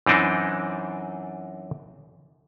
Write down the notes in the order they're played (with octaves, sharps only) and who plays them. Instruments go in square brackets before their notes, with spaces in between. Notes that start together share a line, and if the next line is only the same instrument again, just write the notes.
[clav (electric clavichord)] F#2 E3 C4 D4 D#4